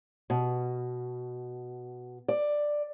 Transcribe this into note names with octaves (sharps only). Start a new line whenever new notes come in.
B2
D5